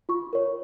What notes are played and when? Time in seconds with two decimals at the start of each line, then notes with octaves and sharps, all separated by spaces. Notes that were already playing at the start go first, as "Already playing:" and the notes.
0.09 F4 C#6
0.33 A#4 C#5